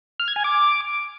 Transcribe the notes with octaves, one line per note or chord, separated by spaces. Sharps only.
F6
G#6
G#5
D6